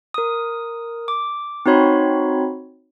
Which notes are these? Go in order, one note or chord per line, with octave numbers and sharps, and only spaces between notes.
A#4 D#6
D6
C4 D#4 F#4 C#5 B5 C6